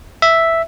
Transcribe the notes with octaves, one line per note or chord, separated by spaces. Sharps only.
E5